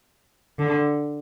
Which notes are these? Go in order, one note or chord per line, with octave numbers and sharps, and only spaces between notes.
D3